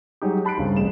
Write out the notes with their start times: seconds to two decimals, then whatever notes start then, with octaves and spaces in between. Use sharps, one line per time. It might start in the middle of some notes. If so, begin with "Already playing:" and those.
0.22 F#3 G#3 D#4 G4
0.45 A5 B5 F#6 C7 D7
0.57 C2 G2 C#3 C4
0.76 A1 C3 G#4 E7